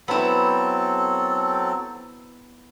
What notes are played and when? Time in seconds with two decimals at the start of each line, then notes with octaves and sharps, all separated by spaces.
0.08 F#3 B3 C4 E4 A4